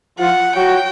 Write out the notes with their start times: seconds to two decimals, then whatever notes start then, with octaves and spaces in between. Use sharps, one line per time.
0.19 F3 F4 F#5
0.55 F#3 F#4 G5